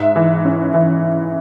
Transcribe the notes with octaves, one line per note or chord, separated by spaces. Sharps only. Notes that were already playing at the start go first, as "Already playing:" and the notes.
Already playing: G#2 E5
E3
C#4
E3